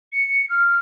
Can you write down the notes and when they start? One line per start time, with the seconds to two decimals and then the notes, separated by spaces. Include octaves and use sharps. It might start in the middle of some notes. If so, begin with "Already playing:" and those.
0.12 C#7
0.49 F6